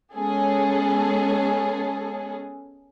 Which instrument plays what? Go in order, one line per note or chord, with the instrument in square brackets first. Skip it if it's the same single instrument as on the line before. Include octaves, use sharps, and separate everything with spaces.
[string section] G#3 B3 C#4 G#4 A4